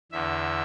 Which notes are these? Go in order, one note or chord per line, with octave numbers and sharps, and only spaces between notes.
E2 D3 E5